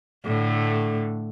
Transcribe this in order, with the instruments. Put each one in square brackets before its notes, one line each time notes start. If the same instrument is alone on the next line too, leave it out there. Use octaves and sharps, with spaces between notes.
[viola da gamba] A2 D3 A3